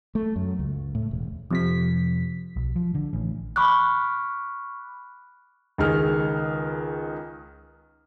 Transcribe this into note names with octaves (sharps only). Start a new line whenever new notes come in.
A3
F#2
C#2
A2
E1
F2 C3 B6
B1
F3
D3
A1
B5 C#6 D6 F6 F#6
C#2 D#3 G#4 F6